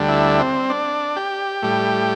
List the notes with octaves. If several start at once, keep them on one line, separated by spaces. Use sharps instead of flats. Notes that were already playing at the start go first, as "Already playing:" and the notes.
Already playing: D2 D3 G3
E4
C4
D4
G4
A2 G3